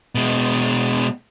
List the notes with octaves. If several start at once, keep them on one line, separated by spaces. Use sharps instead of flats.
B2 G#3